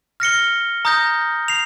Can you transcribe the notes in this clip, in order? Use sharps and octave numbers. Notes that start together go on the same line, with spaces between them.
F6 A#6 C#7 G7
A#5 D#6 G6 A#6
C7 F7